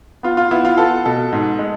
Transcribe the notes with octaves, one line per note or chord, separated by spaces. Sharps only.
B3 F4
F4
B3 E4
F4
B3 A4
B2 A4
G#2
G#3